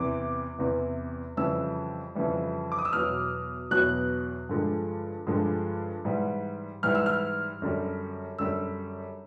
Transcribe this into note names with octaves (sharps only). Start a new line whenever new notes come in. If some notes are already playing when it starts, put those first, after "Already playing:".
Already playing: E2 C3 E3 D6
E2 C3 E3
F2 C#3 E3 G3 E6
F2 C#3 E3 G3
D6
D#6
E6
E2 B2 F#3 F6
E2 B2 F#3 F#6
G2 D3 F3 G#3
G2 D3 F3 G#3
G#2 E3 G3
G#2 E3 G3 F6
E6
F6
F#2 D3 G3
F#2 D3 G3 E6